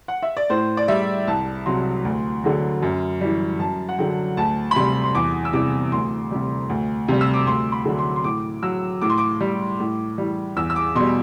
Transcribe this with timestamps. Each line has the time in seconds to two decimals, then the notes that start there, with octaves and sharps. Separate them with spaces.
0.08 F#5
0.22 E5
0.37 D5
0.50 A2 C5
0.77 D5
0.88 G3 E5
1.27 C2 A5
1.66 C3 F#3 C6
2.05 D2
2.44 D3 F#3
2.82 F#2
3.21 E3 G3
3.59 F#2 A5
3.89 F#5
3.98 D3 F#3 G5
4.37 D2 A5
4.71 B5
4.75 C3 G3 C6
5.04 C6
5.15 E2 D6
5.45 E6
5.53 C3 E3 G3 D6
5.92 D2 C6
6.31 C3 G3
6.69 D2
7.08 C3 G3
7.21 E6
7.34 D6
7.47 D2 C6
7.72 B5
7.85 D3 F#3
7.99 C6
8.16 C6
8.24 A2 D6
8.63 F#3 E6
9.01 A2 D6
9.10 C6
9.18 D6
9.40 G3
9.80 A2
10.18 E3 G3
10.56 E2 E6
10.70 E6
10.76 D6
10.95 B2 C6
11.00 G3